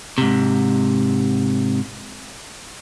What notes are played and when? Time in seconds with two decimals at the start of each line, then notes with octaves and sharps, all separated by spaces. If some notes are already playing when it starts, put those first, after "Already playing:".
0.18 G#2 C3